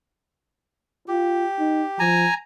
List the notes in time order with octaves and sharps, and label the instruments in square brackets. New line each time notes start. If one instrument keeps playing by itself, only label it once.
[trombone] F4 [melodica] G4
[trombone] D#4
[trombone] F3 [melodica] G#5 A#5